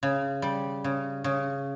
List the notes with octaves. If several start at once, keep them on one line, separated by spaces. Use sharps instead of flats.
C#3
G3
C#3
C#3